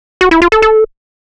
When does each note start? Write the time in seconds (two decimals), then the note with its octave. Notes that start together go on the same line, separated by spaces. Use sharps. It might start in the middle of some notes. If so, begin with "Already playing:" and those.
0.21 F#4
0.31 E4
0.42 F4
0.52 A4
0.62 A4